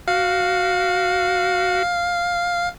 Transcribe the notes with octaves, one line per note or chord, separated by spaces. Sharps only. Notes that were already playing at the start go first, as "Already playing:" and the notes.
F#4 F5